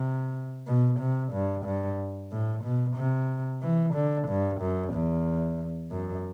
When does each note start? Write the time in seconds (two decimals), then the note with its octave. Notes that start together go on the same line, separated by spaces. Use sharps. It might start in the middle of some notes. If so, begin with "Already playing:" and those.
Already playing: C3
0.67 B2
1.00 C3
1.33 G2
1.66 G2
2.32 A2
2.64 B2
2.97 C3
3.63 E3
3.95 D3
4.29 G2
4.61 F#2
4.94 E2
5.92 F#2